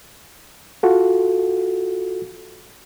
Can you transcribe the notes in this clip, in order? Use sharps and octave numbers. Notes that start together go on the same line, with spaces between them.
F4 F#4 A4